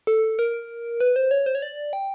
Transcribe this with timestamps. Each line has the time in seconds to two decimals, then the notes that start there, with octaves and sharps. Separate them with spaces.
0.07 A4
0.39 A#4
1.00 B4
1.16 C5
1.31 C#5
1.46 C5
1.55 C#5
1.62 D5
1.93 G5